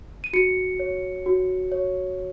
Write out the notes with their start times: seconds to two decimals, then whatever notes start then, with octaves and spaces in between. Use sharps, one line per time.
0.24 D#7
0.33 F#4 C#7
0.79 C#5
1.26 F#4
1.72 C#5